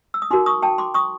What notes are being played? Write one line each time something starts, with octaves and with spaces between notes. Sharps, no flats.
E6
D#6
D#4 F#4 A#4 C6 D6
C#6 D#6
G5 A5
C6 D6
C#6 D#6